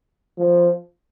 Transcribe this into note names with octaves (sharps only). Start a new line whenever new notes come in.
F3